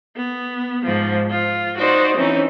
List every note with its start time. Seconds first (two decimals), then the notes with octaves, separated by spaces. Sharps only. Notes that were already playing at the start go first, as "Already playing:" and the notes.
0.16 B3
0.85 G#2 F3
1.31 F4
1.77 D#4 F#4 C5 D5
2.17 E3 C4 C#4 D#4